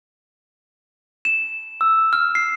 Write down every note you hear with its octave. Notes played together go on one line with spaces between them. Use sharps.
E7
E6
F6
C7